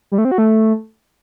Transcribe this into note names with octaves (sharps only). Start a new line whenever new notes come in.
G3
A3
C4
F#4
A3